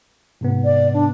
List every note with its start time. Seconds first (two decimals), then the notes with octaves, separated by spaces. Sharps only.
0.41 G#2 C3 B3
0.64 D5
0.94 D4